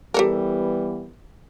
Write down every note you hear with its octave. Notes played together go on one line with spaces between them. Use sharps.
E3 G3 B3 G4 A4 A#4